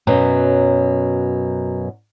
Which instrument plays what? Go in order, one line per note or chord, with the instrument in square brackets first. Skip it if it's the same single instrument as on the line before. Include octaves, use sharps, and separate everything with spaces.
[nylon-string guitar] F#2 B2 F#3